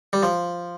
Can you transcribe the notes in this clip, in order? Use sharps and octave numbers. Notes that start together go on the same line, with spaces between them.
G3
F3